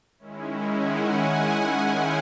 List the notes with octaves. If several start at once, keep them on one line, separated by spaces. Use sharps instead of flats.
D#3 G#3 C#4 E4
F#5 G#5
F5 G5